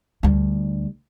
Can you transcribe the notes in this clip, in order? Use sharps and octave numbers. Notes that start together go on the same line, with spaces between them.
D2 G3